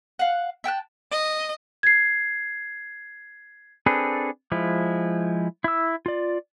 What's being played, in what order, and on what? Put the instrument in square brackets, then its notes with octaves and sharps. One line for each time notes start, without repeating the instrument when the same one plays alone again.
[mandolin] F5 F#5
E5 G5 A5 F#6
[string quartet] D#5
[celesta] G#6 C7
[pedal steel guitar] C4 D4 G#4 A4 B4
F3 G#3 E4
E4 E6
F4 D5